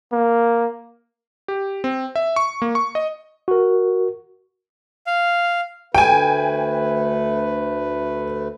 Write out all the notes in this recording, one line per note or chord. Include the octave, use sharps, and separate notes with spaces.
A#3
G4
C4
E5
C#6
A#3
C#6
D#5
F#4 A#4
F5
D2 A3 B4 G5 G#5